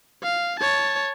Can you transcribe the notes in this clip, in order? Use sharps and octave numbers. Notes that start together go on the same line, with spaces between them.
F5
C#5 A5